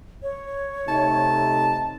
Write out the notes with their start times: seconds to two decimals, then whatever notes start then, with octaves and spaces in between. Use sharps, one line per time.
0.23 C#5
0.88 C3 A3 D#4 A5